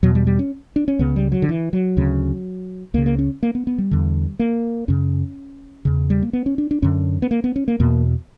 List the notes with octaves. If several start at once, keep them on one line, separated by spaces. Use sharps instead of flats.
E2 B2 F#3
G3
G3
C#4
D4
C#4
C#2 C#3 B3
G3
F#3
D3
E3
F#3
D2 C#3
C#2 C#3 A#3
A#3
C#4
A#3
B3
B3
G3
E2 D3
A#3
F#2 C#3 C#4
E2 C#3
G3
A#3
B3
C#4
D4
D4
F#2 D3 C#4
B3
A#3
B3
C#4
A#3
E2 B2 A#3